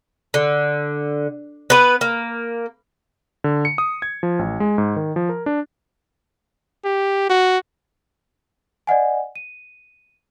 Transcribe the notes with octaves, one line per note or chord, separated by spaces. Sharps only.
D3
B3 B4
A#3
D3
C#7
D#6
G#6
F3
A1
G#3
G#2
D#3
F3
A#4
D4
G4
F#4
D5 D#5 F#5 G#5
D#7